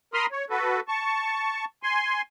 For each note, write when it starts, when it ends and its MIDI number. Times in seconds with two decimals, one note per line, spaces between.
0.14 0.26 70
0.14 0.26 83
0.14 0.26 84
0.14 0.26 87
0.14 0.26 89
0.32 0.45 73
0.50 0.80 66
0.50 0.80 69
0.50 0.80 71
0.88 1.65 81
0.88 1.65 85
1.83 2.22 80
1.83 2.22 84